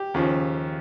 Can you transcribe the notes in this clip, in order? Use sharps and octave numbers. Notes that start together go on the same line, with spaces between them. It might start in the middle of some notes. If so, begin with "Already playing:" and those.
Already playing: G4
D#2 C#3 F3